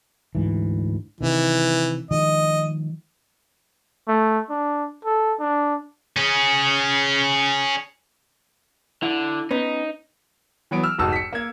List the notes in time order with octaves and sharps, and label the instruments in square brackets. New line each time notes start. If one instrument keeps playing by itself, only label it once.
[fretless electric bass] D2 G#2 E3
[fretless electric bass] C3 D#3 [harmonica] E3
[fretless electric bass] D#3 F3 G#3 [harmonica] D#5
[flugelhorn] A3
D4
A4
D4
[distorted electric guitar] C#4 G#4
[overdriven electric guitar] D3 [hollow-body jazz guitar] E4
[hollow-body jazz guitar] B3 C#4 [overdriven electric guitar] D#4
[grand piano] E3 F#3 B3 D7
E6 F6
F1 G#2 D#4 F#4 A5 E6
B6 C#7
A#3 G#6